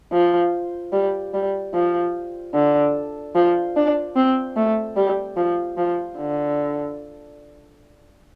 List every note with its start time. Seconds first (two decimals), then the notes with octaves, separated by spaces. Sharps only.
0.13 F3
0.93 G3
1.34 G3
1.74 F3
2.54 D3
3.35 F3
3.76 D4
4.16 C4
4.57 A3
4.97 G3
5.36 F3
5.78 F3
6.18 D3